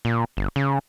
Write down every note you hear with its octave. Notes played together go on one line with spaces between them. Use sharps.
A#2
G1
C#3